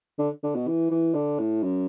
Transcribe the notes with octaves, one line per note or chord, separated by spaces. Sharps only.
D3
D3
B2
E3
E3
D3
A2
F#2